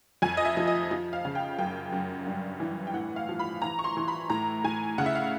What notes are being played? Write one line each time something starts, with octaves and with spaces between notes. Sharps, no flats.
F2 G#5
D#5
E5
F3
D#5
F3
F5
C#3
G5
F#2 G5
F#2
G2
E3
G5
A2 F#5
F5
F3
B5
E3 A#5
C#6
C6
E3
B5
A2 A#5
A2 G#5
C#3 F#5
E5
F5